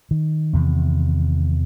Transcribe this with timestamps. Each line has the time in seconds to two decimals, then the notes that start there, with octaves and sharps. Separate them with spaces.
0.11 D#3
0.53 E2 C3